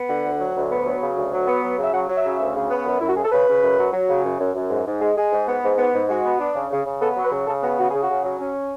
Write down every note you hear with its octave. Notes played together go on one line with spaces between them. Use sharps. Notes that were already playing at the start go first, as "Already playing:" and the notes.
Already playing: B3
D3 F#5
D2
F#3
D2
B3
F#3
C#3
D2
F#3
B3
F#3
C#3 E5
F#3 F#5
F#3
E5
C#3
D2
C#3
B3
F#2
F#2 E4
F#4
C#3 G#4
A4
C#3 B4
C#3
F#2
F#3
F#3
C#3
F#2
F#2
F#2
G#2
G#2
G#3
G#3 G#4
G#2
B3
G#2
B3
G#2
G#3 F#4
B3
D4
C#3
C#3
C#3
B3 A4
F#3
B4
C#3
C#3 A4
B3 F#4
C#3 F#4
C#3 G#4
F#4
C#3
F#3
C#4